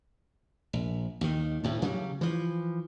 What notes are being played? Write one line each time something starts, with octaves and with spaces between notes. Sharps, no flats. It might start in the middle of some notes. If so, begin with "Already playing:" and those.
A#1
D#2 D#3
D2 A2
C#3 F#3 G3
E3 F3